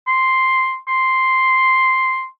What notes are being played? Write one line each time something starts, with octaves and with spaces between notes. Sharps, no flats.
C6
C6